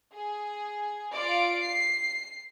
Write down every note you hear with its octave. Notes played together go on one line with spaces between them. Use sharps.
G#4
F4 D5 D7
C7